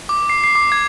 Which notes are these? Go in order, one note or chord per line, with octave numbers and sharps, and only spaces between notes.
D6
C7
C7
D6
G#6